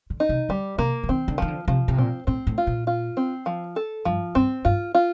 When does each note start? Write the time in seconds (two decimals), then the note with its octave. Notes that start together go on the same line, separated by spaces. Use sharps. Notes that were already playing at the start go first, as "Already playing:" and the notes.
0.10 D3
0.20 D#4
0.29 C3
0.49 D3 G3
0.78 C3 A#3
1.03 D3
1.09 D#3 C4
1.28 D3
1.38 D#3 F3
1.48 D3
1.68 C3 F3
1.88 C3
1.98 A#2 C4
2.27 A2 C4
2.47 A2
2.58 F4
2.67 A#2
2.87 F4
3.17 C4
3.46 F3
3.76 A4
4.05 G2 F3
4.35 G2 C4
4.65 G2 F4
4.95 F4